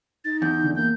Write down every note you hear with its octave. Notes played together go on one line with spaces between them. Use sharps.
D#4 A6
E2 G6
D3
A#3 G6